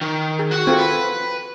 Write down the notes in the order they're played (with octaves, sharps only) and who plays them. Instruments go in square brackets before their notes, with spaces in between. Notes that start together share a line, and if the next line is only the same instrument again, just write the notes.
[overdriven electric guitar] D#3
[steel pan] G#4
[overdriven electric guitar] F#4 F#5
[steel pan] C4 F4 A4
[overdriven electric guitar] B4